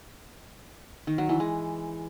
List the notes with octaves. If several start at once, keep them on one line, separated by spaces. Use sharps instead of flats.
D#3
F#3
E3
G#3